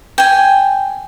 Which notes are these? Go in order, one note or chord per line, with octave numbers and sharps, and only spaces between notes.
G5 G#5